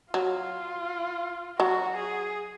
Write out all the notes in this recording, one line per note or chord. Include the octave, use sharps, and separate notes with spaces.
F#3 F4
F#3 F#4
G#4